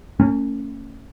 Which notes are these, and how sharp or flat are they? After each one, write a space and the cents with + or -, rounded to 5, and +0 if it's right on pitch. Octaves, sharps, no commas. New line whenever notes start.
A3 +45 C#4 +0